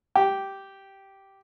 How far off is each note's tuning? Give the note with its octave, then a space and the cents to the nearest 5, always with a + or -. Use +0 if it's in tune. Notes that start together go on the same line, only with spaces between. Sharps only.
G4 -10